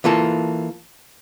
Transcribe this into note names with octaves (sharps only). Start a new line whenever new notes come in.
E3 A#3 F4 A4